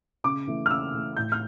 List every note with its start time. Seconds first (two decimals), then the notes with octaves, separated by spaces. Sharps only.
0.24 C#3 D6
0.47 E3 A3
0.66 F6
0.70 C#3 E6
0.94 E3 A3
1.17 A2 G6
1.32 F6